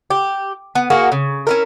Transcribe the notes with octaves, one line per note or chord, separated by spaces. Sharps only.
G4
B3
A#3 F#4 G#4 A#4
C#3
C#4 E4 A#4